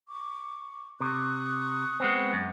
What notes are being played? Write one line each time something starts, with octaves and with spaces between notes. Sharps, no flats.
C#6 D6
C3 C#6 D#6 F#6
G#3 B3 C4
F#2